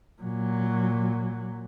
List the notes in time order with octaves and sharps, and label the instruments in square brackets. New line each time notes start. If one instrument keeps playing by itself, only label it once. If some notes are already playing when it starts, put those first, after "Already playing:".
[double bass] A#2 F#3